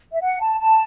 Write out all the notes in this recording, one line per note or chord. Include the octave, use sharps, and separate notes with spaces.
E5
F#5
A5
A5